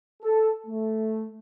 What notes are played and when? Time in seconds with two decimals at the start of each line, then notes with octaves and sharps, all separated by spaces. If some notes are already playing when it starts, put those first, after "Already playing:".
0.22 A4
0.66 A3